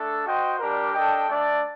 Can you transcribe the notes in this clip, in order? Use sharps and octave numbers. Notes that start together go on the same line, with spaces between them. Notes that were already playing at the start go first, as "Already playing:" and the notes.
Already playing: A3 D4 A4
F#4 C5 D#5 G5
G3 D4 G4 A#4
D4 A4 D#5 G5
A3 D4 A4 D5